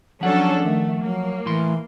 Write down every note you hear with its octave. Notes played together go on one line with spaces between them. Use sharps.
F3 F#3 C#4 D4 A4 F#5
D#3 A3
F#3 A#3
A2 E3 C6